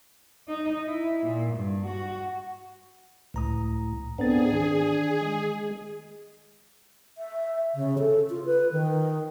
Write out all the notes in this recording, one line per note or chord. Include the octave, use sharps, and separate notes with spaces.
D#4
E4
A#2
G2
F#4
C#2 A2 A#5 D#6
G#2 B3 C4 D4 G#4 A4 A6
D#3 D4
G#3
E5
C#3
A4
F4
B4
D#3